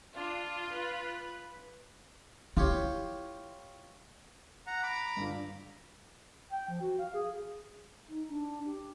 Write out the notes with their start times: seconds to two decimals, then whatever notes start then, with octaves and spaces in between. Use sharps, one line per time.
0.14 D4 F4
0.70 B4
2.57 E4 F4 G4 C#5
4.67 F#5 A#5
4.83 A#5 B5 D6
5.17 G2 D3 F4
6.52 G5
6.69 F3
6.81 F#4
6.99 F5
7.14 G#4
8.08 D#4
8.29 D4
8.65 G4